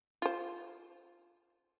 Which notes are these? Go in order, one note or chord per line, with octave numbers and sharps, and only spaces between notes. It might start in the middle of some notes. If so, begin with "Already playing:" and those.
F4 C5